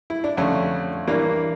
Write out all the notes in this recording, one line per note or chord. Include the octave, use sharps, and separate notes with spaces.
E4
D4
F2 D3 A3 C#4
G2 E3 A#3 D4